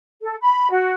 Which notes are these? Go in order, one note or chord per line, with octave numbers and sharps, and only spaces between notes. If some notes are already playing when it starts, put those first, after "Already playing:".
A4
B5
F#4